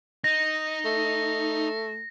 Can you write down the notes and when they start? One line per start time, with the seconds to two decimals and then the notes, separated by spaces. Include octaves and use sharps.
0.24 D#4 A#6
0.85 A3